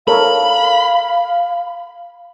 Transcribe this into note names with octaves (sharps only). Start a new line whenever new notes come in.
A4 A#4 C#5 F5 B5